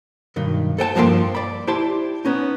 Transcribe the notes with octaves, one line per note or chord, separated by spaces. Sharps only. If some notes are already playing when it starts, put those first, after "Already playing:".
B1 G2 D#3
A4 C5 G5 A5
G2 F3 A#3 F5 G5 C6
D5 B5
E4 G4 C5 D5 A5 C6
B3 C#4 D#4